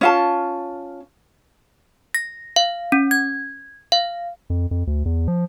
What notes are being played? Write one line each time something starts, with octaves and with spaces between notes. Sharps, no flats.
C#4 F4 A5
A#6
F5
C#4
G#6
F5
F2
F2
D2
E2
F3